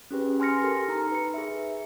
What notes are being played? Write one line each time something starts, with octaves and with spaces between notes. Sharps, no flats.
C#4 G4 G#4 B4
G#5 C6 F6 A#6 C#7
G4 A4 A#4
D#4 A#5
B4 C#7
G#4 E5